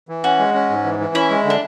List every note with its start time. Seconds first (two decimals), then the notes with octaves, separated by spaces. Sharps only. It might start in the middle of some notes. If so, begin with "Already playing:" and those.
0.09 E3
0.24 C#4 F#4
0.39 G#3
0.54 C#4
0.70 G#2
0.84 E3
0.99 E3
1.15 C#4 E4
1.30 G#3
1.45 D3
1.50 D4